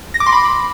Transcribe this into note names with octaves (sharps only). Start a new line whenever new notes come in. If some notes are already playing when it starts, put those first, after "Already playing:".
A#6
D6
C6
B5